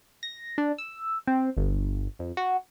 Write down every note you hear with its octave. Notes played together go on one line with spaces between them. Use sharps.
A#6
D4
E6
C4
G1
F2
F#4